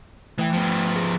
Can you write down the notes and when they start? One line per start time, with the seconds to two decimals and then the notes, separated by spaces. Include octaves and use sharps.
0.38 E3 A3 G5
0.53 F3 B3
0.96 G#4